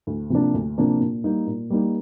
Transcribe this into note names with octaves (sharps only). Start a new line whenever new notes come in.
D2
C3 F3 A#3 D4
D2
C3 F3 A#3 D4
A#2
G3 A#3 D#4
A#2
G3 A#3 D#4